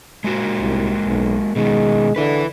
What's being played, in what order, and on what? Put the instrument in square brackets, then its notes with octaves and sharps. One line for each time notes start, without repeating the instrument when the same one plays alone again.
[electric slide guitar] G#3 A#3 F#4
[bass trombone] C2
B1
[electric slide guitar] B2 D#3 [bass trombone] G#3
[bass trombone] D3 [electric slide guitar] E4 B4